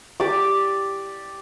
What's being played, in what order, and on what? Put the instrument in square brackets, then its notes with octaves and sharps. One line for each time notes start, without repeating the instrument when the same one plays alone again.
[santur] G4 D5 D6